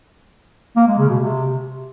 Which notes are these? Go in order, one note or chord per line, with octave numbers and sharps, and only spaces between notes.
A#3
G#3
C#3
B2
C3